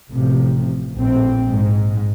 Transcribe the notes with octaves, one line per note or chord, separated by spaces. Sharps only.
A1 C3 F3
A#1 A2 C4
G#2